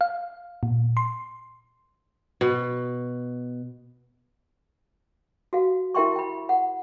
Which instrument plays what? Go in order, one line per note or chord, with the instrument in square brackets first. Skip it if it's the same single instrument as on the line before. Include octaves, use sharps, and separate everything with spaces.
[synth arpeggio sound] F5
A#2
C6
[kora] B2
[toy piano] F#4 F5
E4 A#4 E5 G5 C6 C#6
G5 B5
F#5